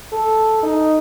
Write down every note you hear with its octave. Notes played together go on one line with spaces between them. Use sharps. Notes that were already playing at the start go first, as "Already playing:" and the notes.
A4
D#4